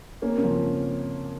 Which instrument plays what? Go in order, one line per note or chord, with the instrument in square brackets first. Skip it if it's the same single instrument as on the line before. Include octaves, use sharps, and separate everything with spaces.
[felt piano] A#3 [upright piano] C#4
[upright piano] C4
C#3 C#4
[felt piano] F3